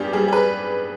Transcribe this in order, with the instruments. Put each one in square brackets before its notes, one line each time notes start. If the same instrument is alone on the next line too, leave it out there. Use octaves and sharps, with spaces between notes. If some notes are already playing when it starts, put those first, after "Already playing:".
Already playing: [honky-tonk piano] G2 B3 G4 G#4 D5
G3 G#4
G#4
B4